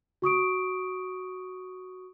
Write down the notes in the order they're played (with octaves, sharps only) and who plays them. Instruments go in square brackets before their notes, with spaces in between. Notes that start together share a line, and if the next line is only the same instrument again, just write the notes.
[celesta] F#4 C#6 D#6 D7